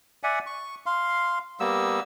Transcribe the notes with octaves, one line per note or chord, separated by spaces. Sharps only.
D5 E5 F#5 G#5
C#6
F5 C6
G3 A#3 B3 E6